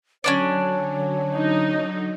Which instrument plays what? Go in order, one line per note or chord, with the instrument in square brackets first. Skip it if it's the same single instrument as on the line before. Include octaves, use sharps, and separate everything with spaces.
[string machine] D3 F#3 [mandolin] C#4 D4 D5 [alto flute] C#5
[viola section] D#4